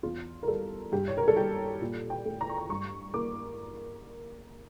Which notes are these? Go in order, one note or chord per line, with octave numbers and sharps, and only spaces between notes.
E2 F4
A#4
G3 A4
G2 G4
C#5
A#4
A4
G3 G4
A#2
G5
A3
A#5
C#6
A#5
G2 C#6
A#3 D6